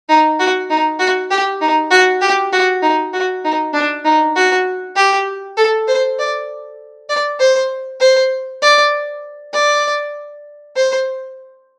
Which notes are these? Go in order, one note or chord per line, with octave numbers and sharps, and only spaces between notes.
D#4
F#4
D#4
F#4
G4
D#4
F#4
G4
F#4
D#4
F#4
D#4
D4
D#4
F#4
G4
A4
C5
D5
D5
C5
C5
D5
D5
C5